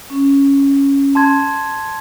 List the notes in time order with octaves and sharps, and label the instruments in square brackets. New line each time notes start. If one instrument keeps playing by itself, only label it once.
[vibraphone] C#4
[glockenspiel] A5 C6 G#6